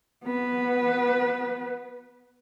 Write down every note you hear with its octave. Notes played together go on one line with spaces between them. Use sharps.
B3 B4